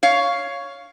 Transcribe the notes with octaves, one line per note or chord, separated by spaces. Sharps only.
C#5 F5